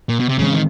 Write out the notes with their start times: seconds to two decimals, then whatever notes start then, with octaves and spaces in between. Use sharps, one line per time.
0.09 A#2
0.20 B2
0.29 C3
0.39 A2 C#3 E3 G#3 C4
0.54 D#3